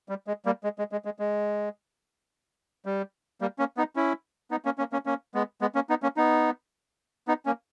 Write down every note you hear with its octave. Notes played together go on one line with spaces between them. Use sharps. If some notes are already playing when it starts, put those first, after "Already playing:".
G3
G#3
G3 A#3
G#3
G#3
G#3
G#3
G#3
G3
G3 A#3
A#3 C#4
B3 D#4
C#4 E4
B3 D#4
A#3 C#4
A#3 C#4
A#3 C#4
A#3 C#4
G#3 B3
G#3 B3
A#3 C#4
B3 D#4
A#3 C#4
B3 D#4
B3 D#4
A#3 C#4